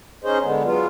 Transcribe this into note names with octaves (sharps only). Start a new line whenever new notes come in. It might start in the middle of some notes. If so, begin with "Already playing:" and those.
C#4 D#4 G#4 C5 D#5
D3 G#3 B3
F#3 G#3 B3 F4